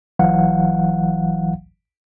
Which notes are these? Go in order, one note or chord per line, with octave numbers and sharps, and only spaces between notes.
G1 E3 F#3 F5 F#5